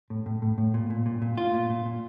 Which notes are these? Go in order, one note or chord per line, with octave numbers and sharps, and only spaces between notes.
A2
A2
A2
A2
A#2
A#2
A#2
A#2
A#2 F4
A#2
A#2
A#2